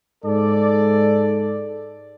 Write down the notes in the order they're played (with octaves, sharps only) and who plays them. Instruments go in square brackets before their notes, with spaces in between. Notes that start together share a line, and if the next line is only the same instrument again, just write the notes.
[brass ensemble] G#2 A4 D5